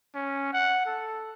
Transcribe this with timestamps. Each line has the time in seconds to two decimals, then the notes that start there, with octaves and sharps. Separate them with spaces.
0.15 C#4
0.53 F#5
0.86 A4